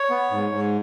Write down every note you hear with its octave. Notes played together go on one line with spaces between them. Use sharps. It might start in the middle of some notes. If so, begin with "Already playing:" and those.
Already playing: C#5
B3
G#2
G#2